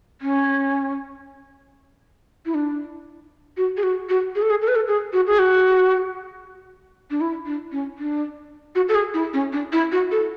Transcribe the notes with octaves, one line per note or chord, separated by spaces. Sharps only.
C#4
E4
D4
F#4
G#4
F#4
F#4
G#4
A4
G#4
A4
B4
A4
G#4
F#4
G#4
F#4
D4
E4
D4
C#4
D4
F#4
A4
G#4
E4
C#4
D4
E4
F#4
A4